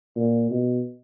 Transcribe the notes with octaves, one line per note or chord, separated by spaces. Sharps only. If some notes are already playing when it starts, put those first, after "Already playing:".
A#2
B2